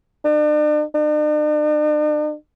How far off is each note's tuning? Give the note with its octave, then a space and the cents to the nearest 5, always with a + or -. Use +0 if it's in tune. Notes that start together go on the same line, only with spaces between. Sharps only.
D4 +40
D4 +45